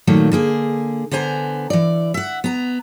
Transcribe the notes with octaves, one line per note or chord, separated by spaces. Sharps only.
A#2 D#3 F#3 A3 A#3
D3 A#3 G#4
D3 B3 C5 G#5 A#5
E3 D5
E5 F#5
B3 A#5